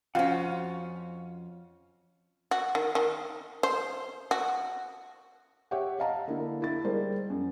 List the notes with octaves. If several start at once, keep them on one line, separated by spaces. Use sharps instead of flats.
F2 C#4 F4 F#4 C5 F#5
F#4
D#3
D#3
C5
F#4
G4 C#5 E5 F#5 G5
D#5 F5 A5 A#5
D3 A#3 E4
E4 A6
G3 G#3 A#4 C5
F#2